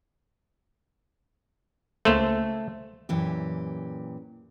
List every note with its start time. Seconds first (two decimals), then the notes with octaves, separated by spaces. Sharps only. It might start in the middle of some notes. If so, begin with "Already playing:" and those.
2.05 C#2 A3 A#3 A4 C5
3.09 F#2 A#2 E3 G4